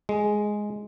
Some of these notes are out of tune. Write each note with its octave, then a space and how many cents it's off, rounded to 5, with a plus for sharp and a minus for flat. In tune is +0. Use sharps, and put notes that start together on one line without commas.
G#3 +5